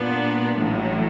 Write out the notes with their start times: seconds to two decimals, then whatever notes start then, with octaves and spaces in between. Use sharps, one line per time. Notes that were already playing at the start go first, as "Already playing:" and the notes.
Already playing: A#2 G3 B3 D4
0.59 A1 A2 F#3